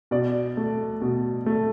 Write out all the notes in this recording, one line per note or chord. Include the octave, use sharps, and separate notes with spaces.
B2 D5
A3
B2
A3